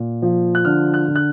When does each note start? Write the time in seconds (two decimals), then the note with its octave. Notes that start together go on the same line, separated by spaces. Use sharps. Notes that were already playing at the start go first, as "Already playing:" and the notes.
Already playing: A#2
0.22 F3
0.55 F#6
0.65 D3 F6
0.94 F#6
1.08 D3
1.16 F#6